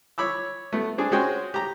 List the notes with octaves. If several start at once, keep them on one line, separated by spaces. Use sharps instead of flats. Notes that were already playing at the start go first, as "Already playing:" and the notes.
C#5 B5 D6 E6
A3 B3
C4 D4 G#4
G#3 C#4 F#4 G#4 C5 G5
G4 A#5